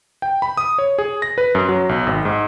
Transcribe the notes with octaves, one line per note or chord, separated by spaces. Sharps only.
G5
B5
D#6
C#5
G#4
A#6
B4
F#2
F#3
B1
G#1
G#2